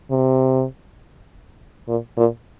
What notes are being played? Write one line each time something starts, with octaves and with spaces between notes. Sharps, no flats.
C3
A#2
A#2